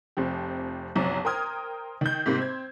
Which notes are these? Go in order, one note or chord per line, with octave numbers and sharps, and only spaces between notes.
F1 C3 F3 G4
F#1 B1 C3 F3 A#5
A#4 C5 G5 D#6 F6 G#6
D#3 G6
G#2 C3 G3 A#3
C4 G#6